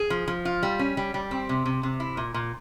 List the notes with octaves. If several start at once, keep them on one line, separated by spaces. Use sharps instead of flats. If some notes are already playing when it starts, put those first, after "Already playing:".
Already playing: G#4
F3
F3
F4
G3
C#4
G3
G3
C4
C3
C3
C3
E4
A#2
A#2